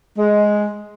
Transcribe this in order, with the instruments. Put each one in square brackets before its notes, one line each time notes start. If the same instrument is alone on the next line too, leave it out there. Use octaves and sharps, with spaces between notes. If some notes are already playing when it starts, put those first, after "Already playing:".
[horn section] G#3